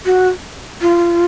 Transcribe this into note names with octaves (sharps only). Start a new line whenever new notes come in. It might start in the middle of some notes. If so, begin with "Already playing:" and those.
F#4
F4